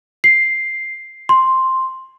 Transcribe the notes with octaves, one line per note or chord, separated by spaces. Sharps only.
C7
C6